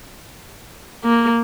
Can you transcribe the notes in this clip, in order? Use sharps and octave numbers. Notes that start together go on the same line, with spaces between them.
A#3